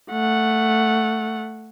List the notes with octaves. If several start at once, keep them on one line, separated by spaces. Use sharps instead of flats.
A3 F#5